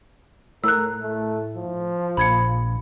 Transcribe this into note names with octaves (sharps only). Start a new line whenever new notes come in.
A2 A#4 E6 F#6
A3
F3
A#1 B5 G#6 C#7